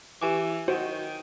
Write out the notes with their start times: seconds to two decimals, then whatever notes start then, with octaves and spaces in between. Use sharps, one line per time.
0.22 E3 G4 G#5 D6
0.68 D#3 F#4 C5